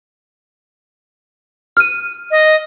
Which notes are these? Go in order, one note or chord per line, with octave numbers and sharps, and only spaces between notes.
F6 D#7
D#5